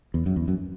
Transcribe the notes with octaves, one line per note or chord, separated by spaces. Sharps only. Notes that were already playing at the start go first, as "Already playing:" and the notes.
E2
F#2
E2
F#2